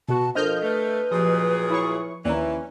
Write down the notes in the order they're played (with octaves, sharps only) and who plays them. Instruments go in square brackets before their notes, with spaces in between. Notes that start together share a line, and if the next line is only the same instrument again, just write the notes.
[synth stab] B2 F#4 [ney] A5
[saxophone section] F3 [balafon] D4 A4 A#4 [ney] C5 [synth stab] D#5 F6 G6
[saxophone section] A3 [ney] B4
[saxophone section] A#2 F#3 G#4 [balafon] F3 G4
[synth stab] E4 C#5 C#6
[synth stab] D#2 [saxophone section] E3 [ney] C#4 [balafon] D5 A#5